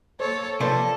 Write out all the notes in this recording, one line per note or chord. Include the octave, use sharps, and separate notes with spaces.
A#3 A4 C5 C#5
C3 F3 A#3 A4 B4 C5 D5